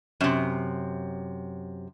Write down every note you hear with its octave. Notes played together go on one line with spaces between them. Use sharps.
F#2 C3